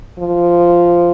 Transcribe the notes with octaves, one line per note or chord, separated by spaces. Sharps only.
F3